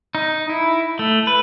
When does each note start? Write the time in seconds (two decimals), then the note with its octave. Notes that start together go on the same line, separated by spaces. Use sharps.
0.15 D#4
0.49 E4
0.99 A3
1.27 B4